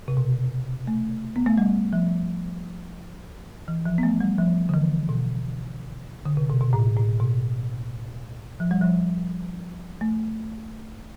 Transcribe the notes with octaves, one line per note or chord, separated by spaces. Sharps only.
C3
B2
A3
B3
A3
G3
F3
E3
F3
B3
A3
G3
F3
D3
E3
B2
D3
C3
B2
B2
A2
A2
B2
F3
G3
F3
A3